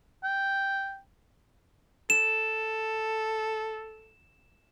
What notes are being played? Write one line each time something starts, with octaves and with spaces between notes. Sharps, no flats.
G5
A4 E7